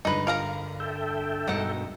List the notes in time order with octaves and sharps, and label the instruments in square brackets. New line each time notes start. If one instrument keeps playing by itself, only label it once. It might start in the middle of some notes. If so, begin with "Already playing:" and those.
[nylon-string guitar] G2 D3 G#3 [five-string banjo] D#4 B4
[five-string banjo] A#4 F5 A#5
[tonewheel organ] A4 E5 G5
[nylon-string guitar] G2 B2 G#3 [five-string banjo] D#3 F#5